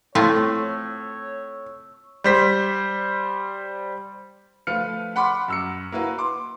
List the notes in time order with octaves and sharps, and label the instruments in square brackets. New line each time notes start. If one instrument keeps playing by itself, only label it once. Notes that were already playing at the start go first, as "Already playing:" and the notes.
[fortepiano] A2 [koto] A3 C4 F4 [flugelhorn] C#5 [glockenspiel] C#6 E6
[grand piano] G3 C5 B6
F3 A3 B4 F5 F6 C#7
F#5 B5 C6 D6
F#2 E6 C#7
A#3 E4 F#4 B4
C6 D6